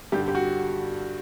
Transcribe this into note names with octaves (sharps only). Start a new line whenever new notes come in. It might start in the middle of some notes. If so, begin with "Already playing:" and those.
G2 D3 G4
G4
F#4